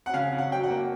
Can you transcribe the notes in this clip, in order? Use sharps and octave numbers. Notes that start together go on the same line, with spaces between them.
F#5
C#3 F5
C#3
F#5
F#3 G5
F#5
A#3